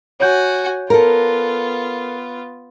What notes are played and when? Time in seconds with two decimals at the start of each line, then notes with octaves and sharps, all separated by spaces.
0.20 F#4 C#5 G#5 G6
0.90 B3 F4 A4 A#4